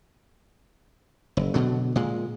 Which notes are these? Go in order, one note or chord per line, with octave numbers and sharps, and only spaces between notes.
F#1
B2 D3 F#3
A#2 G#3